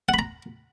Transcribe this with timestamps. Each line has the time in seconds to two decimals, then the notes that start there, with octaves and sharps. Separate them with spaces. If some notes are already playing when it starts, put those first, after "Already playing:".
0.09 F#5
0.14 B5
0.19 A#5